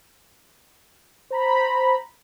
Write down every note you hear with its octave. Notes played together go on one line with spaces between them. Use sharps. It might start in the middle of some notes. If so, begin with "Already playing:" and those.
C5 A#5 B5